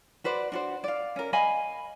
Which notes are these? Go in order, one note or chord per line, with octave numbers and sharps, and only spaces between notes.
F#4 B4 C5 D5
D4 F#4 C5
D5 F5
C#4 A#4
D#5 F5 G#5 B5